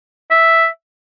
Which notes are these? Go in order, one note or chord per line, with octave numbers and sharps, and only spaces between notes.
E5